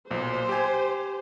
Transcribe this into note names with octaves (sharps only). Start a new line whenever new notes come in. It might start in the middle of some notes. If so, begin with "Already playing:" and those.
B1 A#2 C5
G4 G#5